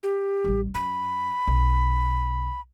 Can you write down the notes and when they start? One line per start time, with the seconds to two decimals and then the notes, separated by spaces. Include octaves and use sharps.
0.03 G4
0.44 A1 G3
0.75 F#2 B5
1.47 B1